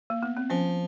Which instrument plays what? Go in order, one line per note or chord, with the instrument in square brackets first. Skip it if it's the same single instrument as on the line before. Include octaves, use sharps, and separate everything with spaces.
[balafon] A#3
B3
C4
[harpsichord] F3 [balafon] C#4